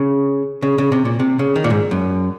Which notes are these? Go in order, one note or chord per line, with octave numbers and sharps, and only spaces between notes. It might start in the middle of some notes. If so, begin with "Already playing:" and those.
Already playing: C#3
C#3
C#3
C3
A#2
C3
C#3
D#3
A#2
G#2
F#2